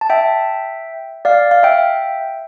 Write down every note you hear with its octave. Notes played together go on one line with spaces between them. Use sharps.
A5
E5 G5
D5 F5
F5
E5 G5